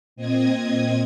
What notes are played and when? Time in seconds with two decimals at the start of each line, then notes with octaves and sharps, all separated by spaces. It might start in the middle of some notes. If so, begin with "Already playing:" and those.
0.16 A#2 C4 D#5 D#6 G#6